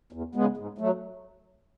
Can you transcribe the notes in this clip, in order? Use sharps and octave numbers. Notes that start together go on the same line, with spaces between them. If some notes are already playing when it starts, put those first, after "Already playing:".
E2
C#3 G#3 B3
G#2
F#3 A3